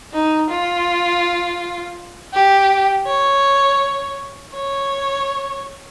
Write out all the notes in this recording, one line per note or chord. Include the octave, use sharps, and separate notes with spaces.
D#4
F4
G4
C#5
C#5